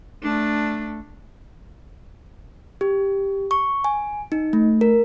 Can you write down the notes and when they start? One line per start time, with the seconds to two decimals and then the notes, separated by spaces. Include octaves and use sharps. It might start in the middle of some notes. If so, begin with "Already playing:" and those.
0.23 A3 D4
2.81 G4
3.51 C#6
3.84 G#5
4.32 D#4
4.53 A3
4.81 A#4